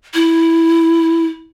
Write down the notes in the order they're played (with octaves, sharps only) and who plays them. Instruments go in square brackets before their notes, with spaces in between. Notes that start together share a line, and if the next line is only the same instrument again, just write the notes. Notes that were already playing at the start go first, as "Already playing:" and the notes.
[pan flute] E4